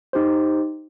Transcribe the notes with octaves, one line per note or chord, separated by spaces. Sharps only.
D#4 G4 C5